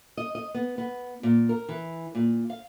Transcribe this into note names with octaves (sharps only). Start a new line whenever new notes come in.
D#5
D#5
B3
B3
A#2
A#4
E3
A#2
F5